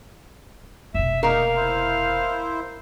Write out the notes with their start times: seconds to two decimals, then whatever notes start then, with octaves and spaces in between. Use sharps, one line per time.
0.94 F1 B2 E5
1.23 A#3 D#4 A#4 F5 C#6
1.56 E4 C5